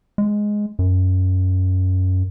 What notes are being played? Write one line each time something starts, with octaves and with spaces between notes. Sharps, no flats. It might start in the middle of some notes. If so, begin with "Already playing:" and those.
G#3
F#2